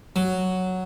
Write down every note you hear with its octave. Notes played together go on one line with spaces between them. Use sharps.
F#3